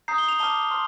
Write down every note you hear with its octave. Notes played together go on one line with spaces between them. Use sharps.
A#5 D#6 G6 C7
G7
F7
A5 D6 F6 G7
C6 F6